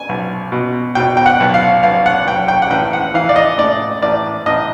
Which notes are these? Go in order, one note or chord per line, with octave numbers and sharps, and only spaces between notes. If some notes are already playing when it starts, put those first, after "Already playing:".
Already playing: G#5
B1
B2
B2 G5
G5
F#5
B1
F5
B1 F5
F#5
B1 G5
G5
F#5
A1 G5
F#5
E3 F5
D5
D#5
A2 D5
A1 D5
A1 D#5